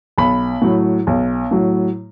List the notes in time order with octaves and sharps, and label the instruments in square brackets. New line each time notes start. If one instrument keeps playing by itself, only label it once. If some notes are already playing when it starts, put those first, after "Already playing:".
[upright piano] B1 B5
A2 F#3
B1
A2 F#3